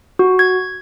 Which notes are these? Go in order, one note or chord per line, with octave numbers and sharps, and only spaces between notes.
F#4
G#6